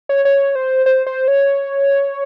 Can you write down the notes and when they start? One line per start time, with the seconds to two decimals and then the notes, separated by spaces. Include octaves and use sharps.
0.09 C#5
0.25 C#5
0.55 C5
0.86 C5
1.07 C5
1.28 C#5